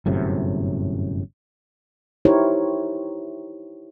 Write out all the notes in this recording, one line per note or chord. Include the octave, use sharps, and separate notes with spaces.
G1 F#2 A2 C3
D#4 E4 G4 A#4 C5 C#5